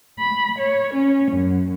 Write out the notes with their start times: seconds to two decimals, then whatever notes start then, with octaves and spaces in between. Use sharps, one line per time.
0.19 B5
0.58 C#5
0.93 C#4
1.31 F#2